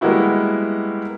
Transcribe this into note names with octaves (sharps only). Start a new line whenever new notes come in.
G3 G#3 A#3 B3 E4 F#4